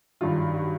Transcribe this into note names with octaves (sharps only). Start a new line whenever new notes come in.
G2 D#3 F#3 F4
F#4